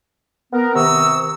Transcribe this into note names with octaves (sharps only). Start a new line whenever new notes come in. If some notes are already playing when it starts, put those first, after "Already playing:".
B3 A#4
C3 D#3 A#5 C#6 D#6 E6